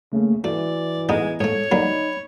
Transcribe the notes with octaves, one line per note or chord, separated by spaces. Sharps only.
C#3 A3 A#3
E3 A3 F#4 D5
G#3 A3 B3 D#4
G#2 A3 A4 C#5
D3 F#3 A#3 D#4 B5